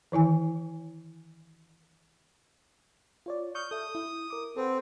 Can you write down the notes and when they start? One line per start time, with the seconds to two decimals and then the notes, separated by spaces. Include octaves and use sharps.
0.12 D#3 E3 E4 G#5
3.26 F4 C#5 D5
3.55 C#6 D#6 F6 G6
3.71 A4 E5 D#6
3.95 E4
4.30 A#4 D6
4.57 C4 A4 B4 F#5